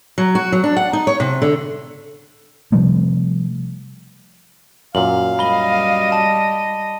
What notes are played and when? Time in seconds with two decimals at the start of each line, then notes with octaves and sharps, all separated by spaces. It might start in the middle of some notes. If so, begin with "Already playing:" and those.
0.18 F#3
0.35 F#4
0.52 F#3
0.64 D4
0.77 F#5
0.93 D#4
1.07 C#5
1.20 C3
1.42 D3
2.72 C3 F3 G3 A3
4.95 F#2 A#2 F5 F#7
5.39 G3 D#5 B5 G7
6.12 A5